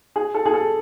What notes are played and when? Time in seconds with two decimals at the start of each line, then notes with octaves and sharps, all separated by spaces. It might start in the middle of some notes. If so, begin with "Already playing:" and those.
0.16 G#4
0.34 A4
0.46 G#4
0.54 A4